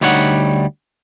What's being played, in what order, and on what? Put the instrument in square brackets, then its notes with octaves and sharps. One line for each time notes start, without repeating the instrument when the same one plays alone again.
[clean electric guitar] D2 G3 D#4 C#5 D5 F#5